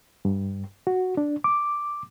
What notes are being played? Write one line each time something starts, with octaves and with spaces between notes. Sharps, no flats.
G2
F#4
D4
D6